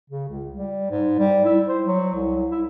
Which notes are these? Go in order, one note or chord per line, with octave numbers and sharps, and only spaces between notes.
C#3
C#2
G3
G#2
G3
E4
C5
F#3
C2
E4